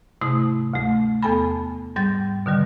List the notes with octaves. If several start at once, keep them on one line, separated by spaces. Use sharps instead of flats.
G#2 C3 A3 E4 D#6
D2 A3
E2 B3 A4 G#5 A5 B5
G#2 G3 G6 A6
B2 D3 D#3 G3